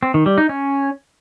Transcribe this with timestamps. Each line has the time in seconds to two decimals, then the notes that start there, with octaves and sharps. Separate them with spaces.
0.03 C4
0.14 D#3
0.26 G3
0.38 D#4
0.49 C#4